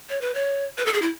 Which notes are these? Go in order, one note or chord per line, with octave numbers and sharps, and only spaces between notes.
C#5
B4
C#5
B4
A4
G#4
E4